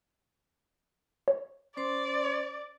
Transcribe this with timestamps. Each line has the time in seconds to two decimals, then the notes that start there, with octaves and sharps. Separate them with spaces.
1.28 C#5
1.77 C#4 C5 D5 C6